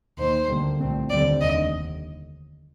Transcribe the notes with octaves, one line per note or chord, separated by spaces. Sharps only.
D#2 D#3 A#3 C5
D2 D3 G3 A#3
C2 A#2 A3 C4
D#2 D3 G3 C4 D5
F1 D#2 D3 D#5